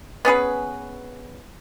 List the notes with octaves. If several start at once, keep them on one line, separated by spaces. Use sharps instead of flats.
B3 C#4 G#4 B4